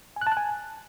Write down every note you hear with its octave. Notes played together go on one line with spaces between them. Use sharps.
G#5
F#6
A5
F#6
G#5